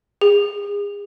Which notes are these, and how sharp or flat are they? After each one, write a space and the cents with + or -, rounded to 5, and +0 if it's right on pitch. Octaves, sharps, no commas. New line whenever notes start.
G#4 -35